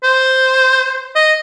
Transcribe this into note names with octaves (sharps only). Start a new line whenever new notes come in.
C5
D#5